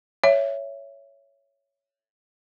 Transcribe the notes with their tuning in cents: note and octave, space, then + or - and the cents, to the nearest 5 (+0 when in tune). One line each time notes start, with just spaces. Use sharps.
C#5 +10 E5 +10